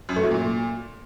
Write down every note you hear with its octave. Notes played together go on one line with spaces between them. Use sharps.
F#2
A3
F#3
A#2